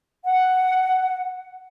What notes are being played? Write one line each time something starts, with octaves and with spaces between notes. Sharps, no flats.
F#5